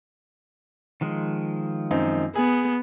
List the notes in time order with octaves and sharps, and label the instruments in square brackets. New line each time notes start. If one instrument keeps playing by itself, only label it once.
[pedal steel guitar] D#3 F3 G#3
[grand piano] F#2 C4 D#4
[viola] B3 [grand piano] G#4